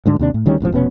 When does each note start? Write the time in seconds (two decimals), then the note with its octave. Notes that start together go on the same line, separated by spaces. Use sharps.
0.06 D2 G#2 D3
0.19 D#2 C3 D4
0.34 A2
0.46 D2 D#3 G3 C#4
0.60 E1 A1 D2 F3
0.72 F1 B2 B3 C#4